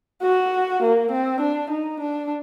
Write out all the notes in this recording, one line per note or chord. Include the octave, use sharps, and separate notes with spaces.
F#4
A#3
C4
D4
D#4
D4